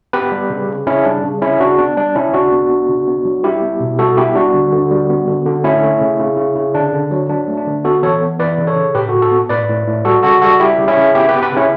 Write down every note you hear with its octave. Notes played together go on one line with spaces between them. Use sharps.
B3 G4 B4
G3
C#3
C#3
C#3 C#4 E4
G3 D4
C#3
C#3 C#4 E4
C#3 D4 F#4
B3 D4
G3 D4
C#3 C#4 E4
C#3 D4 F#4
B3
B3
C#3
B3
F#3
G3 E4 G4
B3
B2
G3 F#4 A4
B3 E4 G4
G3 D4 F#4
D3
D3
G3
B3
D3
D3
A3 C#4 E4
A3
C#3
C#3
C#3
C#3
D3 D4
D3
F#3
F#3 D4
A3
D4
D3
B3 F#4 A4
E3 A4 C#5
B3
E3 B4 D5
C#3
A4 C#5
C#3
A2 G4 B4
F#4 A4
A2
F#4 A4
B3
A2 B4 D5
A2
A2
G3 F#4 A4
C#3 F#4 A4
G3 F#4 A4
G3 E4 G4
C#3
C#4 E4
C#3
B3 E4 G4
B3 G4 B4
G4 B4
C#3 C#4 E4